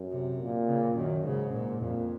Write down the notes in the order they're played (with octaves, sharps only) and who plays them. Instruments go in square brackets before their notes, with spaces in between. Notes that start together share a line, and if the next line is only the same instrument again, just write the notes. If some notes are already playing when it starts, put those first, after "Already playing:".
Already playing: [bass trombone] F#2
[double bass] C3
[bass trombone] A#2
[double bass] C#3
[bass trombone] F#2 [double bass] D#3
[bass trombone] G#2 [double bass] C#3
[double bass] A#2
[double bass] F2 [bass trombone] A#2